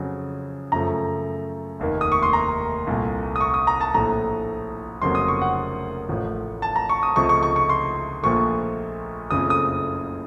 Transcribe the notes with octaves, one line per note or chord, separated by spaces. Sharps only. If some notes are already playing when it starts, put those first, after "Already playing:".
Already playing: F2 C#3 F#3
F#2 C#3 F3 A3 A#5
F1 D#2 D#3 A#3
D#6
C#6
C6
A#5
C2 A#2 A3
D#6
C#6
D#6
A#5
A5
A#1 A2 A3 A#5
F1 F2 C#3 F#3 A#3 C6
D#6
C#6
F#5
A1 A2 F3
A5
A#5
C#6
D#6
C#2 C3 F3 A3 C#6
C#6
C#6
C#6
C6
A#1 A#2 F3 A3 C#6
F#1 F2 C#3 F3 A3 D#6
D#6